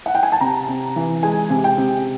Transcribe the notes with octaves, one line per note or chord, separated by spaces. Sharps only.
F#5
G5
G#5
A5
C3 A#5
C3
E3
G#3 G#5
C3
G5
C3